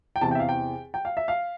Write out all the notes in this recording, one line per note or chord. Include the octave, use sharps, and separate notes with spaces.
G5
E2 C3 E3 A5
G5
E5
F5
G5
G5
F5
E5
F5